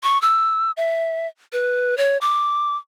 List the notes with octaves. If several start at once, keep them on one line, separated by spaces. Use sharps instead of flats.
C#6
E6
E5
B4
C#5
D6